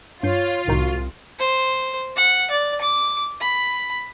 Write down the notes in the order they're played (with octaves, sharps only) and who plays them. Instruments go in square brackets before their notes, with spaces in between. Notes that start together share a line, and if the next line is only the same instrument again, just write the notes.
[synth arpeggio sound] G2 G6 C7 [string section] F4 [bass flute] C#5
[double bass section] C2 [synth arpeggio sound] A2 D#3 D#4 [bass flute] F#4
[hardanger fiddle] C5
F#5
D5
D6
B5